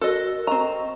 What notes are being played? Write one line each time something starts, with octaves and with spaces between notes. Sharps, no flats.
F#4 A4 A#4 D#5
C4 D#5 A#5 C#6